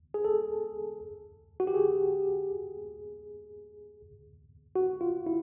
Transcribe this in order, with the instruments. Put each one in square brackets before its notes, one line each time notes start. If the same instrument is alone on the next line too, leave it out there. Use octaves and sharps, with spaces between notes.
[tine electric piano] G#4
A4
F#4
G4
G#4
F#4
F4
E4